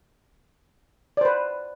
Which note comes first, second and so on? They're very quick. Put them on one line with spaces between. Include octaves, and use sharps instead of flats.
D5 C5 B4